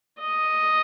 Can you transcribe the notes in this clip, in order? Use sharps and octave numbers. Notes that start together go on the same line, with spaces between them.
D#5